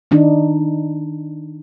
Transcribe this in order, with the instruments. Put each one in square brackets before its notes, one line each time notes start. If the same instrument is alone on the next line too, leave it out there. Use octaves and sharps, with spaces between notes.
[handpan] D#3 D4 D#4